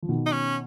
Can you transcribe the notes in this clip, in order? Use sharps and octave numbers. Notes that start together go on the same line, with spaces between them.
F3
B2 D#3
D#4
C#4